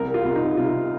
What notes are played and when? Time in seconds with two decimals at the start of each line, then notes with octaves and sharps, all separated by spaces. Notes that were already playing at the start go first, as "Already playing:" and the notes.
Already playing: C2 A#4
0.14 F4
0.25 C2
0.35 D#4
0.57 C3 F4